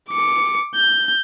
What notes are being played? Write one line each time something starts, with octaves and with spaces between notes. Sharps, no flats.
D6 C#7
G6